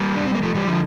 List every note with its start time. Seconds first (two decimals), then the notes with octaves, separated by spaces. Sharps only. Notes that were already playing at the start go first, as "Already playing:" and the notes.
Already playing: G3 A#3
0.16 D4
0.26 C4
0.35 A#3
0.43 F3 A3
0.55 E3 G3
0.67 D3 F3